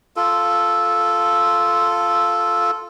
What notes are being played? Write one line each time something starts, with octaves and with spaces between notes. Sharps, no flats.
F4 A4